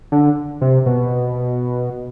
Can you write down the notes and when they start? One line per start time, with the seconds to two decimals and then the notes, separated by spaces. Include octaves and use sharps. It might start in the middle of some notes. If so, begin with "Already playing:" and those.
0.12 D3
0.61 C3
0.86 B2